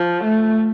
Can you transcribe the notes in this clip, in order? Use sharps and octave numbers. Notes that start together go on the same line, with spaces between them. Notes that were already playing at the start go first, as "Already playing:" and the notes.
Already playing: F3
A3